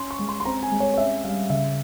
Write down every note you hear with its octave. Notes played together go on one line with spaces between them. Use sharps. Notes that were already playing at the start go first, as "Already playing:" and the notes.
Already playing: C#4 C6
C#6
G#3
C6
C6
C4 A#5
G#5
G#3
C#5
C#5
C#4 E5
G3 F5
C#3 E5